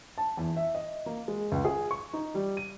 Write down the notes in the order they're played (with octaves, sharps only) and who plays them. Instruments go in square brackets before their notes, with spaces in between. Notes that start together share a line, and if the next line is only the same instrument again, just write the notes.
[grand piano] A5
E2
E5
D#5
A#3
G#3
C#2
G#4
C#6
D#4
G3
D#7